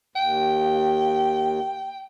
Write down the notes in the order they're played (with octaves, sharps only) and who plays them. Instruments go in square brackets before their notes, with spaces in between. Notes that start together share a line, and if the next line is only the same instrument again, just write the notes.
[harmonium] D#2 [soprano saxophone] G5